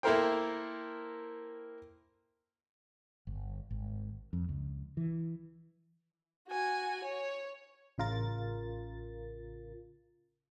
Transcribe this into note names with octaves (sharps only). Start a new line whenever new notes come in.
A#3 E4 A4 A#4 C5 G5
G1
G#1
F2
C#2
E3
F#4 G#5
C#5
A1 C#3 F4 A#4 A6